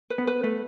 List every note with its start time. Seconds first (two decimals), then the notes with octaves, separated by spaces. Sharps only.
0.10 B4
0.18 B3
0.27 B4
0.43 A3 B4